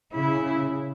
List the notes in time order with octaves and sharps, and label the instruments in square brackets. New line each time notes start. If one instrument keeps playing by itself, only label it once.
[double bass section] C#3 [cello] E4